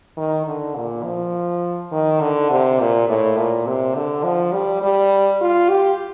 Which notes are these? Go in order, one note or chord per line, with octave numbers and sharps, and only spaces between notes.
D#3
D3
A#2
F3
D#3
D3
C3
A#2
A2
A#2
C3
D3
F3
G3
G3
F4
G4